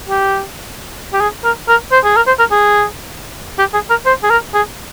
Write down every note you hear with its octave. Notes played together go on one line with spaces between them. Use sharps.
G4
G4
G#4
A#4
A#4
C5
G#4
A#4
C5
A#4
G#4
G4
G#4
A#4
C5
G#4
A#4
G#4